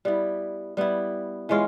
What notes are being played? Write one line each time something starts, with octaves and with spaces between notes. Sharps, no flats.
G3 B3 E4
G3 B3 E4
E3 G#3 C#4 F4